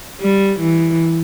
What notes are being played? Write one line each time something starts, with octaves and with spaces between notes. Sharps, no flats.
G3
E3